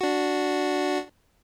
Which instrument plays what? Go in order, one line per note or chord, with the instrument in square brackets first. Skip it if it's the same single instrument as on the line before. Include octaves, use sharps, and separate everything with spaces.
[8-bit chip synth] D4 F#4